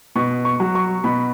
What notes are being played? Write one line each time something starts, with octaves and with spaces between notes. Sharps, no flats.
B2 C#6
C#6
F#3
C#6
B2 B5